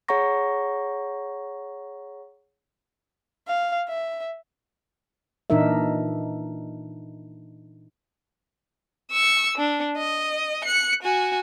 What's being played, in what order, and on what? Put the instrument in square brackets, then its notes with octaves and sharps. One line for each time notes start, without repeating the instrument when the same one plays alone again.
[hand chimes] G#4 C#5 F#5 A#5 C#6 A#6
[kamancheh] F5
E5
[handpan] A#2 E3 D4 D#4 A#4 E5
[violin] C#6 E6
D4
D#5
F#6 C#7
F#4 G#5